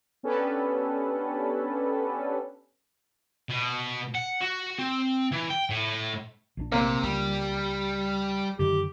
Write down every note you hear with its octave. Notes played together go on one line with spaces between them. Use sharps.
B3 C#4 D4 G4 A4 B4
B2
F#5
F#4
C4
E3
G5
A2
A#1 D#3 D4
C3 A#3
C#2 G3
F#2 D3 D#3 G4